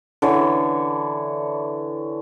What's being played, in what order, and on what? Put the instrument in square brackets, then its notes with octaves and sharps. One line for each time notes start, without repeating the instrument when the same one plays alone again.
[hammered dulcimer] D3 E3 C#5